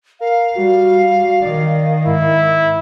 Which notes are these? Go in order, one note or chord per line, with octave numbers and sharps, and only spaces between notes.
A#4 F5
G3 F#4
D#3 D5
G#2 E4